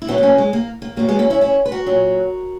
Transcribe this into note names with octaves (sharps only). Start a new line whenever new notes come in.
E4
E2 B2 F#3 B3 D#4
B3
A#3 C#4
G#3
A#3
A#3
E2 B2 F#3 A#3
G#3 B3
A#3 C#4
C#4 E4
C#4 E4
B4
F#4 A#4
A#2 F#3